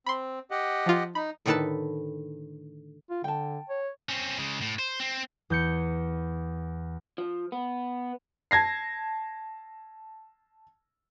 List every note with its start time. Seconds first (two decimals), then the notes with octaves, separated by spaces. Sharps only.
0.06 C4 B5 C6
0.51 G4 D#5 F#5
0.86 F3 F4
1.15 D#4 B5
1.46 A2 D3 D#3 A4 B4 A5
3.10 F4
3.24 D3 G5 A5
3.69 C#5
4.09 C4 C#4
4.38 C#3 G#3
4.61 A2
4.79 C5
5.00 C4
5.50 E2 G6 C#7
7.18 F3
7.52 B3
8.51 A5 G#6 A#6 C7